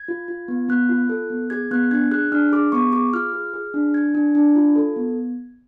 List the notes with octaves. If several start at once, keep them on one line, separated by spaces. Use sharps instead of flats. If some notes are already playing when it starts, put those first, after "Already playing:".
Already playing: G#6
F4
F4
B3
B3 F#6
F4
A4
B3
G#4 G#6
B3 F#6
D4 G#6
G#4 F#6
D4 F6
G#4 D6
B3 C#6
G#4 D6
F4 F6
G#4
G#4
D4
D4 G#6
D4
D4
F4
A4
B3